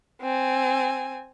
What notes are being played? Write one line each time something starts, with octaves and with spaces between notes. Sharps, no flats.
C4 G#5